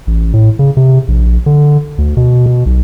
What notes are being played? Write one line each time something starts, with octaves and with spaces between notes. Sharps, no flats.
A1
A2
C#3
C3
A#1
D3
D2
B2
B2
B1